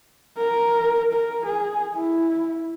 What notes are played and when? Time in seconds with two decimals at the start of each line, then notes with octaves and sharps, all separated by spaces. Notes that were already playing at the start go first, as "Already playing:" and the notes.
0.37 A#4
1.13 A#4
1.46 G#4
1.95 E4